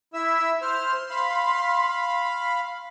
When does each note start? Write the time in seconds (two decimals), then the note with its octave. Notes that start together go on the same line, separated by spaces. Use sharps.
0.14 E4 E5 E6
0.62 C5 C6 F6
1.10 F5 B5